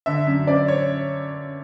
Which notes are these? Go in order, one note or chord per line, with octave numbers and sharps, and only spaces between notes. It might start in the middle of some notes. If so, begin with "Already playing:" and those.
D3 E5
F#2
F#2 D5
C#5